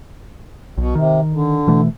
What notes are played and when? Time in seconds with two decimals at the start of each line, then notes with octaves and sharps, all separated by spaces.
0.77 B1 B2
0.95 C3 D#3
1.33 D3
1.67 B2 E3 A3